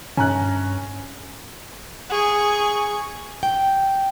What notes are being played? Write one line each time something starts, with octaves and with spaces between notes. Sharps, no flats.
G2 C#4 G#5 A#5 F#6
G#4 C#6
G5